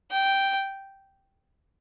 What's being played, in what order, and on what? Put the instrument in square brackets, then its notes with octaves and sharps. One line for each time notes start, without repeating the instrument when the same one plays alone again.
[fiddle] G5